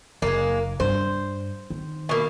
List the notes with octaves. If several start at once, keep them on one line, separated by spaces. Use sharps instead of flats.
F#1 G#3 A#3
G2 C5
D#3
B2 A#3